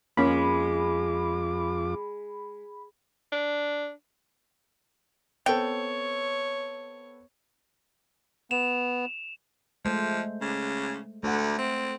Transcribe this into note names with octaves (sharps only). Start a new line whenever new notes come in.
F2 G#3 A#3 C#4 F4 B5 D6
D4
B3 C4 A4 C#5 G5
B3 E7 F7
F3 G#3 A3 C5
C#3
D2 A3 F#5
C4